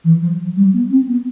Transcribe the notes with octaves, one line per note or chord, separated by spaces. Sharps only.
E3
F3
F3
G3
B3
C4
B3